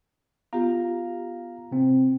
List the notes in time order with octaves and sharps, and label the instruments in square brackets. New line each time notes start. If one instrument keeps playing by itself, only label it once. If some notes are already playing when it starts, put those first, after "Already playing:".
[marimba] B3 F4 G4 [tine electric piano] F5 A#5
[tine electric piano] C3 C4